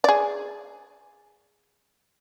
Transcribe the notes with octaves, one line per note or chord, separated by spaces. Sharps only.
G#4 D5